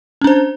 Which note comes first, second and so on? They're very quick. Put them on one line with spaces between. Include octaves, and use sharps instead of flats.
C#4 D4 C5